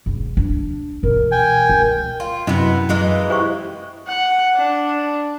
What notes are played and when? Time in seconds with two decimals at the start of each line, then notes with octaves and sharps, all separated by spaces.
0.06 E1
0.37 D4
1.03 B2 E3 A#4
1.31 G5 G#5
1.69 C#2
2.20 F4
2.47 F#2 C3 B3 E4 D#5
2.89 F#2 E3 G#3 A#3
3.30 E4 G4 C5 C#6
4.08 F#5
4.56 D4